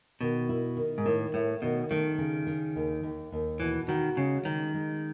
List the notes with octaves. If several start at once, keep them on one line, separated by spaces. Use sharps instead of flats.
B2 D#3
E4
D#3
G#2
A2 D#3
A2 A3
B2 D#3
D#3 A3
C#3
C#3
D#2
D#2
D#2
B2 E3
D#3 F#4
C#3 G#3
D#3 G#3
G#3